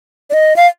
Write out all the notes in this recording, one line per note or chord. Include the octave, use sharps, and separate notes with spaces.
D5
D#5
F5